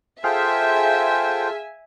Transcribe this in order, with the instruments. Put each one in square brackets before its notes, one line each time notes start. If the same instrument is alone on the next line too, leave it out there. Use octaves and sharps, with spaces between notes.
[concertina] F4 A4 [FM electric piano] G#4 F5 [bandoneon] C5 G5 [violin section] E5 G#5